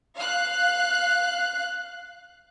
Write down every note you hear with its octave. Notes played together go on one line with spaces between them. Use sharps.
F5 F#6